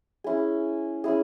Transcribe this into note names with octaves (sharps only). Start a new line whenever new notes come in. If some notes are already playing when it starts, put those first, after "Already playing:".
C#4 E4 G#4
C#4 E4 G#4